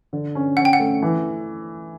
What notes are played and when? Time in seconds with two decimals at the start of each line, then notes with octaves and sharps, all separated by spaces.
0.13 D3
0.35 C#4
0.57 C#4 F#5
0.65 G5
0.73 F#5
0.79 A3
1.02 E3